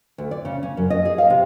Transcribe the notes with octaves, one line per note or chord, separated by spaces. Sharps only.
D2
D5
C#3
C#4
F#2
D#5
G#4
F5
C3